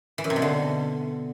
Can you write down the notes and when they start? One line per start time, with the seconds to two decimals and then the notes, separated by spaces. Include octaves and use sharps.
0.18 E3
0.24 F#2
0.30 C3
0.36 B2
0.42 D3